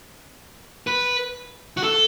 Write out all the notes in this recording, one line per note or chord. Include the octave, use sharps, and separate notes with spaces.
B4
F#4
A4